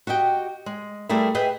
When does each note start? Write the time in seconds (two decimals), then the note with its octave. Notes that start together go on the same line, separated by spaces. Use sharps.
0.07 F#4 G4 D#5 G5
0.66 G#3
1.09 G3 A3 E4 G#4 A#4 E5
1.35 G#4 B4 D#5 E5 G5